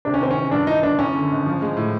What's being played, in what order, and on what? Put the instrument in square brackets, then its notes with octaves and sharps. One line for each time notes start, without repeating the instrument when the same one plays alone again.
[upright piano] C3 [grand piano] D4
[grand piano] C#4
[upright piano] D#3 [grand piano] C4
[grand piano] C#4
[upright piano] E2
[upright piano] G2 [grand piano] D4
[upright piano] E3 [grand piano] D#4
[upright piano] G1 [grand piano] D4
[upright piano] F#2 [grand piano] C#4
[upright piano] D3
G#1
F3
G#3
A2